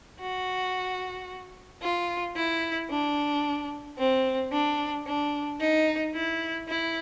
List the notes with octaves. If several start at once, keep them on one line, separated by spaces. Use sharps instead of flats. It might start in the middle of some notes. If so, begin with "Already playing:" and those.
F#4
F4
E4
D4
C4
D4
D4
D#4
E4
E4